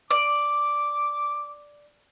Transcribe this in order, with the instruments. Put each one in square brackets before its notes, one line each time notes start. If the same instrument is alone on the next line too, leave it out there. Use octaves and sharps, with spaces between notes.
[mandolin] D5 [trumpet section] D6